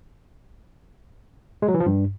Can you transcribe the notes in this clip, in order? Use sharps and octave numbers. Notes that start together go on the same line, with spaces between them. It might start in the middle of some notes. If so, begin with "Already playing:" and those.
G#3
F#3
E3
F3
G2